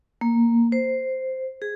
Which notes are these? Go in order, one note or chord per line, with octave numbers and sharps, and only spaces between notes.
A#3
C5
G#4